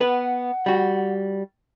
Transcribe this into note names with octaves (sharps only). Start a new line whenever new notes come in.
B3 B4 F#5
G3 F#4